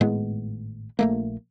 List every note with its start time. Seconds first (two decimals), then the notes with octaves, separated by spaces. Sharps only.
0.01 G#1 A2 G#3 B3
0.99 A#1 A3 A#3